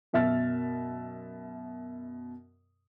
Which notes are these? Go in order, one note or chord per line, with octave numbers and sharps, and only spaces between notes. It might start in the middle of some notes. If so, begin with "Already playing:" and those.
F#2 B2 E5 F6 A6